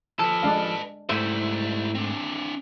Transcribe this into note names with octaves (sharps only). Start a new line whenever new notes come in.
F3 A4 B4 A5
G#3 D4 F5
G#2 G3 A3 E4 C5 E5
C4 D4